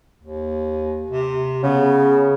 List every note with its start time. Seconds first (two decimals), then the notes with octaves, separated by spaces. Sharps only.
0.23 D#2
1.10 C3
1.64 C#3 B3